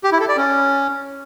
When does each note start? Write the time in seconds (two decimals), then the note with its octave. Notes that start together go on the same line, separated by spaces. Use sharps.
0.04 G4
0.12 E4
0.20 A4
0.29 D5
0.37 C#4